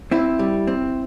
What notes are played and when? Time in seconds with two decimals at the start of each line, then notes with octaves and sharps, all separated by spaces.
0.11 C4 E4
0.39 G3
0.67 C4